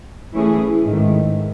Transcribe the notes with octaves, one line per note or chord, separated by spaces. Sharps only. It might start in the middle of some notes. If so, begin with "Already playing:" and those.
E3 A3 C#4 E4 G#4
G#2 D#3 A3